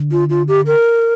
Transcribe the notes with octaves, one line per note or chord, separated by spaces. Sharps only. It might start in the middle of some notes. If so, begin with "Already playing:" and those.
Already playing: D3
F4
F4
G4
A#4